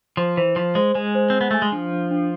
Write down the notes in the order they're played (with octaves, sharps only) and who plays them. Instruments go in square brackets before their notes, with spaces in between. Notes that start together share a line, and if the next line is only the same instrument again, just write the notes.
[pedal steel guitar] F3 [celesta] C5
[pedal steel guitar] E3 [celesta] C5
[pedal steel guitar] F3 [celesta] C5
[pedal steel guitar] G#3 [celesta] C5
[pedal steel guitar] G#3 [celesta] G#5
[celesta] C5
[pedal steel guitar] C4 [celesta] C5
[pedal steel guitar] B3
[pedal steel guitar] A3 [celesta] G#5
[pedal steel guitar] G#3
[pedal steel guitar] F3 [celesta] D4
[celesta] D4
D4